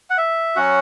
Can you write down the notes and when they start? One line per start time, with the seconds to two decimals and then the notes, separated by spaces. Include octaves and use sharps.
0.10 F#5
0.18 E5
0.56 F#3 C#4 F#4 F#5